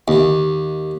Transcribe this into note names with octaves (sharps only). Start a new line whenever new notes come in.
D#2